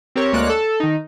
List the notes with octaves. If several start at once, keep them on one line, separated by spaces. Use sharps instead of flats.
C4 G4 A#4 C#5
D2 G#3 A#3 C#5 D5 F#6
A4
D#3 D#4